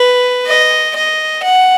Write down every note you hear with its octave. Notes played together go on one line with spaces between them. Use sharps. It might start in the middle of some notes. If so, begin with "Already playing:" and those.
Already playing: B4
D#5
D#5
F#5